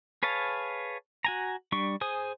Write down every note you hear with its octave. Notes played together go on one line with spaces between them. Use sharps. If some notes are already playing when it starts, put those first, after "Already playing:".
G#4 B4 C#5 F5 A5
F#4 G#5 A#5
G3 D4 C#6
G#4 C5 G#5 D#6